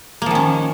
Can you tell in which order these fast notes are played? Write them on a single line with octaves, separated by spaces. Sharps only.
A#3 F3 D#3 C#4